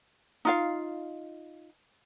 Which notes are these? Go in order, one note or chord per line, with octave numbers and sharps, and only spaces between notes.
D#4 F4 F5